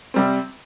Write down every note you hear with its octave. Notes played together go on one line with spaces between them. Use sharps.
C3 G3 C4